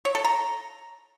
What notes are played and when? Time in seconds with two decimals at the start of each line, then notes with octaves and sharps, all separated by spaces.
0.05 C#5
0.15 A4
0.25 A#5